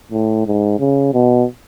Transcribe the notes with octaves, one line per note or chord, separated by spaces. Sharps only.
A2
G#2
C#3
B2